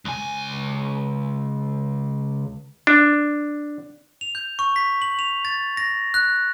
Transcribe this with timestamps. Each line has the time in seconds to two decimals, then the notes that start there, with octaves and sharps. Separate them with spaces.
0.05 C#2 G#5
2.87 D4
4.21 F7
4.35 G6
4.59 C#6
4.76 B6
5.02 F#7
5.19 F7
5.45 A6
5.77 A#6
6.14 F#6